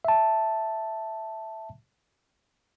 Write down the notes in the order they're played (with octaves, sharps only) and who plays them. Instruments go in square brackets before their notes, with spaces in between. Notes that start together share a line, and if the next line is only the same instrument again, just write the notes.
[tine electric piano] E5 A5